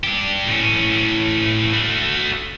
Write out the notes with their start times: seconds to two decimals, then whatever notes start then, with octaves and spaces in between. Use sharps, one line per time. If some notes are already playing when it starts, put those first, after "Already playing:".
0.04 D4 G4
0.46 A2 C#4
1.73 A3 F#4